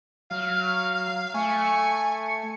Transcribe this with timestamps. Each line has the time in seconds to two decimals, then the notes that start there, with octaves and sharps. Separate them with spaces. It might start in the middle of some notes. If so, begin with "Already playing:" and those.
0.31 F#3 F5 F6
1.34 A3 G#5 C#6
2.28 C#7